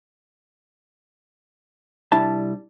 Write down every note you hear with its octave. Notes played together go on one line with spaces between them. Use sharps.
C2 G3 D4 E4 A5